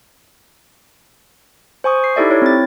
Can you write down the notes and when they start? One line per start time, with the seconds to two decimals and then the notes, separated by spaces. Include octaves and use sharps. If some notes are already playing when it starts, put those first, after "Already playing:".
1.84 C5 G#5 C#6 D#6
2.04 C7
2.16 D#4 E4 G4 A4 D5 E5
2.31 E4 C#5
2.42 C4 A6